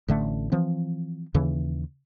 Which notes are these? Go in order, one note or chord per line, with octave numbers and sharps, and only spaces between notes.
A1 D3 A3
E3 F3 C4
D#2 C#3 E3